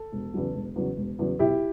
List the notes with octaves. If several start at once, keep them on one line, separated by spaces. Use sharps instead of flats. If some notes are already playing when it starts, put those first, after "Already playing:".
Already playing: A4
E1
E2 C#3 F#3
E1
E2 C#3 F#3
E1
E2 C#3 F#3
B1 E4 G4